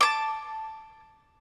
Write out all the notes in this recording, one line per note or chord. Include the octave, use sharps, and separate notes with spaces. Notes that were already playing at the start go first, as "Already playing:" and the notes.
A5 D6